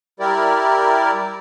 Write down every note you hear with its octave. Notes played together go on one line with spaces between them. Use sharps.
G3 E4 G4 A#4 D5